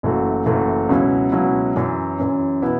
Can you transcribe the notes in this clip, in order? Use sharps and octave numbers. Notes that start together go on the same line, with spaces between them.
F#1 F#2 E3 A3 F#4
F#1 F#2 E3 A3 F#4
C#2 B2 F#3 C#4 E4
C#2 B2 F#3 C#4 E4
F#2 E3 C#4
F#2 E3 C#4
B2 B3 E4